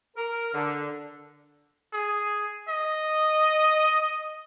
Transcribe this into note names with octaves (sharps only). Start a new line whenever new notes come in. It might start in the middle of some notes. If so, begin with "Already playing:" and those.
A#4
D3
G#4
D#5